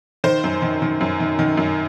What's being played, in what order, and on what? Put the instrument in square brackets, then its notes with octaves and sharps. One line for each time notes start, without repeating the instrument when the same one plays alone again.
[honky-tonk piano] D#3 C5
F#2
D#3
D#3
F#2
D#3
D#3
F#2